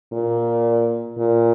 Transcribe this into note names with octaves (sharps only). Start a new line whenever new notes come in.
A#2
A#2